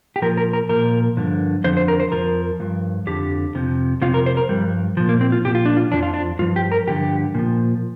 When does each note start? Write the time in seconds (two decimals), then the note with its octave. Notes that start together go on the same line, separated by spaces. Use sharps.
0.16 G4
0.22 A#2 F3 A#4
0.37 A#4
0.53 A#4
0.69 A#2 F3 A#4
1.17 G2 D3 F3
1.64 F2 D3 F3 C5
1.77 C5
1.88 A#4
2.00 C5
2.12 F2 C3 F3 A#4
2.60 G2 F3
3.07 F2 D3 F3 G4
3.55 F2 C3 F3
4.02 F2 C3 F3 F4
4.14 A#4
4.26 C5
4.37 A#4
4.49 G2 F3 G3
4.97 A#2 F3
5.09 A#3
5.21 C4
5.32 F4
5.45 A#2 F3 G4
5.55 F4
5.65 D4
5.77 F4
5.92 F2 D3 F3 D4
6.03 F4
6.14 D4
6.39 G2 F4
6.42 F3
6.56 G4
6.72 A#4
6.87 G2 D3 F3 G4
7.35 A#2 F3